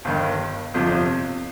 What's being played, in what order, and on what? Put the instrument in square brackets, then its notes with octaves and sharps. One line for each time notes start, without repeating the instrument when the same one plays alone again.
[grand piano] G1 G2 D#3
G1 F2 C3 F3